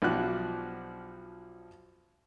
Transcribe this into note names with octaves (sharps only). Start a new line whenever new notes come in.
B1 F3 D4 F#4 G4 F#6